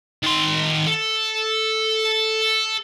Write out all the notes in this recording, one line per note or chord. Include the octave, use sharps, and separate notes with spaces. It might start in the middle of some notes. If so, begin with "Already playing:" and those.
D#3 C6
A4